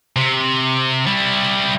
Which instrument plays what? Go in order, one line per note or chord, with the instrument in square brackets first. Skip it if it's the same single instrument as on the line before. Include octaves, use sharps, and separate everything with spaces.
[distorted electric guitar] C3
G3 E4